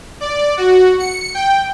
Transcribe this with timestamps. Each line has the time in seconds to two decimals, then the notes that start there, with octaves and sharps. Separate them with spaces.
0.21 D5
0.57 F#4
0.99 C#7
1.35 G5